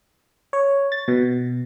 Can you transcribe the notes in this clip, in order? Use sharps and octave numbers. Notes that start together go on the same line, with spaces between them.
C#5
A6
B2